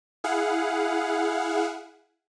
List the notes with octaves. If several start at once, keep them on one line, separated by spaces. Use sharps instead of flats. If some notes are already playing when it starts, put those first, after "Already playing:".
E4 G#4 F5 F#5